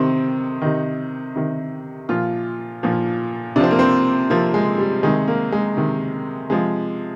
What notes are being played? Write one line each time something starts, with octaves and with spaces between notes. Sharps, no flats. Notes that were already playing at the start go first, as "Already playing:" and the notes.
Already playing: C3 D#3 C4
C3 D#3 D#4
C3 D#3
A#2 F3 F4
A#2 F3
C3 F3 C4 D4
A#3
C4
C3 F3 A#3
G#3
G3
C3 D#3 G#3
A#3
G#3
C3 D#3
C3 F3 G#3